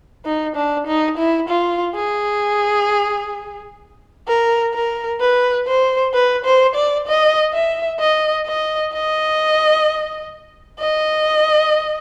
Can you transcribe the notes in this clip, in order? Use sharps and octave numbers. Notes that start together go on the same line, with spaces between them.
D#4
D4
D#4
E4
F4
G#4
A#4
A#4
B4
C5
B4
C5
D5
D#5
E5
D#5
D#5
D#5
D#5